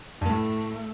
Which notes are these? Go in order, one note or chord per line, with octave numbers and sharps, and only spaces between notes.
G2
A#3
A2 A3